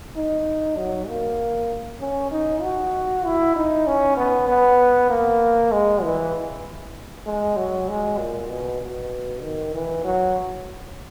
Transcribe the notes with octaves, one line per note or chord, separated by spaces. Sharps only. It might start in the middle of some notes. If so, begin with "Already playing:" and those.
D#4
F#3
A#3
C#4
D#4
F#4
E4
D#4
C#4
B3
B3
A#3
G#3
E3
G#3
F#3
G#3
A#2
B2
B2
D#3
E3
F#3